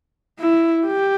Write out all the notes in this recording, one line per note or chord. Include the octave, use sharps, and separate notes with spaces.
E4
G4